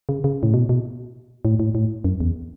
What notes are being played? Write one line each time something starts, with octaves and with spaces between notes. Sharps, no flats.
C#3
C#3
A2
B2
B2
A2
A2
A2
F#2
E2